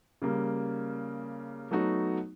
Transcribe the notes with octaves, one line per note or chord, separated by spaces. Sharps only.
C#3 G3 A#3
F#3 A3 B3 D#4 F#4